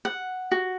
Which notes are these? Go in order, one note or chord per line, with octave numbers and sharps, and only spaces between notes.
F#5
F#4